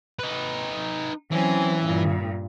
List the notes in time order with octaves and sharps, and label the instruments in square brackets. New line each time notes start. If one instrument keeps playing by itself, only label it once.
[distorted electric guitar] D#4 B4
[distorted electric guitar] E3 [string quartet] F#3 C4 C#4
[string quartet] G2 A#2